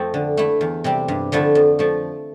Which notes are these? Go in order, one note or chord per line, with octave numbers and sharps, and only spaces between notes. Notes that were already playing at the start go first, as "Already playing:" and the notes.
Already playing: F2 F3 A3 C4
D3
A3 E4
E2
C3 G3 C4
G2
D3 F3 A3 E4
F2
F3 A3